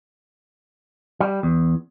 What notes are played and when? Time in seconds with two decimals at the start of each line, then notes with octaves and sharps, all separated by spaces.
1.20 G3
1.43 E2